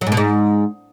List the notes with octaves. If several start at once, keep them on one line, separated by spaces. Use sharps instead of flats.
F#3
G#2
B2
G#2